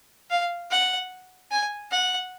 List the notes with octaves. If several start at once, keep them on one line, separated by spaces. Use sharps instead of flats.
F5
F#5
G#5
F#5